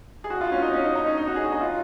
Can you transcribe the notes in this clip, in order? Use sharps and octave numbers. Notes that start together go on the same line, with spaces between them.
G#4
F#4
F4
C#4
D#4
C#4
D#4
D#4
C#4
D#4
F#4
G#4
F#4
D#4
F4